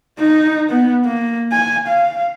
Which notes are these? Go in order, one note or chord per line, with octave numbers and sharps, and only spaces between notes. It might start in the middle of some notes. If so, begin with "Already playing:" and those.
D#4
B3
A#3
G#5
F5